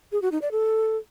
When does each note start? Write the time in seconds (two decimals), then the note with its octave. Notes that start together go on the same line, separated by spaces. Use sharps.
0.12 G#4
0.22 F#4
0.32 D#4
0.42 D5
0.51 A4